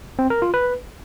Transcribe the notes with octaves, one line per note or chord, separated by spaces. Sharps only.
C4
A#4
F4
B4